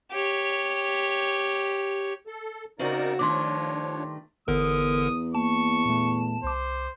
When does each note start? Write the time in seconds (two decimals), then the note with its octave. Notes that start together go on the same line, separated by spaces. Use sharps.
0.11 G4 C#5
2.27 A4
2.79 C#3 C4 D#4 F#4 A#4 D5
3.19 G2 D#3 F3 A3 D4 C#5 C6 D6
4.48 G1 E2 D3 A#4 D#6
5.35 A#3 A5 C#6
5.86 A#2 A3
6.44 C2 C5 D6